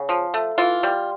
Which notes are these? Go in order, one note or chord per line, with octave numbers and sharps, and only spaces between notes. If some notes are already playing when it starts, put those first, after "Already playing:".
Already playing: C#3
F3
A3
E3 F4
G3